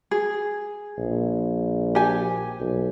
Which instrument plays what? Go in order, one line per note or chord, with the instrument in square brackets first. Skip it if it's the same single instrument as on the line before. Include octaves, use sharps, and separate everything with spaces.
[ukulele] G#4
[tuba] A#1
[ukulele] G4 G#5
[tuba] B1